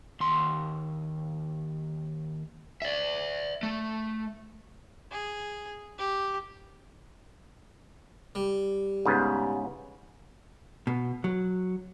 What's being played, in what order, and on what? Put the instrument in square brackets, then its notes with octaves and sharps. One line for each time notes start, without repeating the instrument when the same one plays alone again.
[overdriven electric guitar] D#2 C6
D5 E5
A3
[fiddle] G#4
G4
[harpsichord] G3
[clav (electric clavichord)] G#2 C#3 B3
[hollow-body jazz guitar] B2
F#3